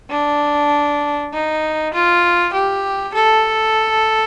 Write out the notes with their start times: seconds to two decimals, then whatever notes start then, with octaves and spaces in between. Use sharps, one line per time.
0.11 D4
1.33 D#4
1.93 F4
2.54 G4
3.15 A4